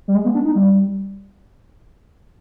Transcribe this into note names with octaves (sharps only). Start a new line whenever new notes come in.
G3
G#3
B3
D4
D#4
G3